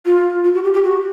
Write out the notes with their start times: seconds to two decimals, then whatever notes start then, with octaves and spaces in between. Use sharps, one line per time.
0.06 F4
0.44 F4
0.55 F#4
0.64 G4
0.74 G4
0.84 F#4